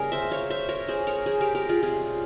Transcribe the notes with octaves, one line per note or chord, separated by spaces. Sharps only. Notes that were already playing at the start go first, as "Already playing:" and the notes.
Already playing: C#3 G3 A#3 G#4 A#4
C5 E5
C#5 F5
C5 E5
A#4 C#5
G#4 C5
A#4 C#5
G#4 C5
G4 A#4
G4 A#4
F4 G#4
C3 G3 C#4 F4 G#4